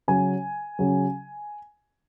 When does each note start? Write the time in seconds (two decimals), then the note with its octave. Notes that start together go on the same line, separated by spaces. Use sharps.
0.08 C#3 F#3 G#5
0.79 C#3 F#3